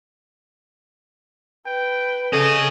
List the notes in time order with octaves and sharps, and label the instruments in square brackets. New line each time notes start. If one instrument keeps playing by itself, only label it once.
[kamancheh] B4 [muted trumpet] G5
[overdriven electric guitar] C#4 G#4 [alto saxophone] A4 [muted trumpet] D#5